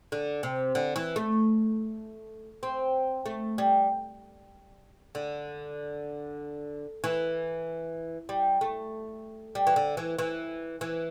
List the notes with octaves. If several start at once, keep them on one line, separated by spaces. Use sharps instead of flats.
D3
C3
D3
E3
A3
C4
A3
G3
D3
E3
G3
A3
G3
E3
D3
E3
E3
E3